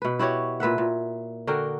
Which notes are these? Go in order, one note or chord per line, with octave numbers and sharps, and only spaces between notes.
B2 B4
E4 F#4 G4 C#5
A#2 B4 E5 F#5
A#2
D3 F#4 A#4 G5